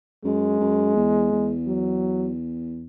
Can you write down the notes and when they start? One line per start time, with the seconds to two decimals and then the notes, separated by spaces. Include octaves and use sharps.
0.24 F#2 G#3
0.60 F#2
0.96 E2
1.32 E2
1.67 F#3